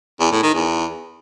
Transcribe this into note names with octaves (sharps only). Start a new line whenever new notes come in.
E2
A2
D#3
E2